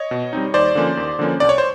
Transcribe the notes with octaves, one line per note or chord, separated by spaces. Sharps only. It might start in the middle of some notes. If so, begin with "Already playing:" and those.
Already playing: C#5 D#5
B2
G3 C4 D#4
D#2 C5 D5
D3 F3 A#3 C#4
D#2
D3 F3 A#3 C#4
C2 D5
C#5
C5